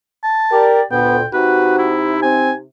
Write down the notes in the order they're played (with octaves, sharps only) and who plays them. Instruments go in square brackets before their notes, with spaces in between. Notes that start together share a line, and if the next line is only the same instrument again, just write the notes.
[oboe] A5
[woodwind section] G4 D5 [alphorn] A#4
[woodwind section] D2 A#2 [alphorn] B3 [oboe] G5
[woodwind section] C3 D#4 [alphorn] F#4 [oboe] B4
[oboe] E4
[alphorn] C4 [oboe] G#5